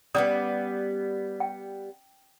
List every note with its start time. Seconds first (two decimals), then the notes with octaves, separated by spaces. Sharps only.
0.15 G3 A#3 B3 C#4 D5 D#6
1.40 G5